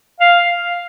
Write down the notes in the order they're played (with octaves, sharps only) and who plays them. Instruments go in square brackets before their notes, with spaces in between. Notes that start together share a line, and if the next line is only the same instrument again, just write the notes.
[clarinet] F5